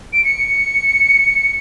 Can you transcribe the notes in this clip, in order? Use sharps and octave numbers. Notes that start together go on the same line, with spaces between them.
D7
C#7